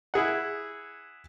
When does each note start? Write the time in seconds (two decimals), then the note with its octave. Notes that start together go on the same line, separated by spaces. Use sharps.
0.14 E4 G#4 F#5